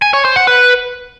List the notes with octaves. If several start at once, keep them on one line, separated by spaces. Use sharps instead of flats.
G#5
C#5
C5
F#5
B4